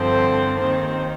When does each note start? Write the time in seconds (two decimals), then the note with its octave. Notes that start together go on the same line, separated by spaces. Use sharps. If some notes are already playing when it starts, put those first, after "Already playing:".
Already playing: G2 D3 F3 C4
0.58 D#2 D#3 C4